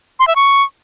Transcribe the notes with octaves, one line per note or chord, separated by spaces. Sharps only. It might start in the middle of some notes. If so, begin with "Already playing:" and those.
C6
E5
C#6